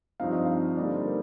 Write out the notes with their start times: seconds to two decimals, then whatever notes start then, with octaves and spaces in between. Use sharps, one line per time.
0.20 G2 F3 C4 D#4 F5
0.33 D#5
0.45 F5
0.77 D3 G3 A#3 D#4 D5
0.91 C5
1.05 A#4